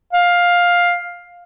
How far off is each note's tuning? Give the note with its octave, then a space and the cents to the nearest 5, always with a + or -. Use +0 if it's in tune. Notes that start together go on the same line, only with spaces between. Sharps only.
F5 +10